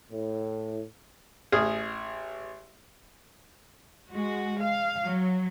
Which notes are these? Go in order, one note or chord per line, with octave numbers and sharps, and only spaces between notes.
A2
A1 G#4 D#6 F6
G#3 F#4
F5
F#3